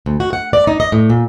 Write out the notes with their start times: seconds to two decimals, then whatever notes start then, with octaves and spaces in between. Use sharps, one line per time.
0.06 D2
0.20 F#4
0.33 F#5
0.53 D5
0.67 D#4
0.80 D#5
0.92 A2
1.10 A#2